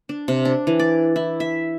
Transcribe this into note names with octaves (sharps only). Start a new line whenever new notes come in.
D4
C3
D4
E3
D5
E4
E5